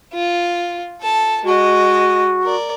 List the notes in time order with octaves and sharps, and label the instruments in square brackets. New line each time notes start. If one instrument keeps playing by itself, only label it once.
[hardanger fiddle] F4
A4 A5
[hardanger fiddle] G#3 D#5 [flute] F#4
[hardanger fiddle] A#4 D5